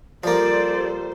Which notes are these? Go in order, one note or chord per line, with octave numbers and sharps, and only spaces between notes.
F3 G3 A#3 A4 C5 D5